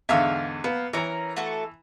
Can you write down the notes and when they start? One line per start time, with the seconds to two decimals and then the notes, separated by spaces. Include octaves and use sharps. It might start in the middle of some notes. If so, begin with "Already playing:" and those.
0.09 E2 G#2 D3 E5 F5 E6
0.64 A#3 B3
0.93 E3 C#4 A#4 A#5
1.36 A3 F#4 A4